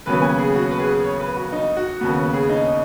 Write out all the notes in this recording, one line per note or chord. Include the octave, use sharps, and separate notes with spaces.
D#2 C#3 F#3 B3 B4
G#5
G#4
F#4
B4
G#4
C#5
B4
F#4
D#4
F#4
D#2 C#3 B3 F#4
G#4
D#4